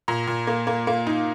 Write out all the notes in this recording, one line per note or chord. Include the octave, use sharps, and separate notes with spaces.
A#2 A#5
A#2
A#3
A#3
A#3
D#4